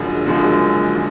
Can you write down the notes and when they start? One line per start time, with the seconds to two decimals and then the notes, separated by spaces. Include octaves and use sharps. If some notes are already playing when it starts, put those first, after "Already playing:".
Already playing: F#1 F#2 D3 F3 G#3
0.26 F#1 F#2 D3 F3 G#3
0.95 D3